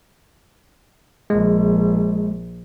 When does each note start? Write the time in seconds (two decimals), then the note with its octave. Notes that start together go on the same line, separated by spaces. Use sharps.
1.30 A#1 G#3